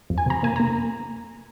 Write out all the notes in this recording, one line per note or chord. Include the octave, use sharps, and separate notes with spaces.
F2
G#5
C3 A#5
A#3 G#5
A#5
A#3